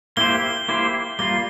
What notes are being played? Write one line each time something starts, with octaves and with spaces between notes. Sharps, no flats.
A#3 E4 G4 C5 G7
A#3 E4 G4 C5
G3 A#3 F4 G7